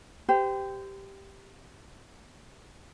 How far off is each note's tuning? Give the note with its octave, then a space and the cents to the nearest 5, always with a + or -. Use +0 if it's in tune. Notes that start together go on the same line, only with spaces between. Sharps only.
G4 +0 C5 -35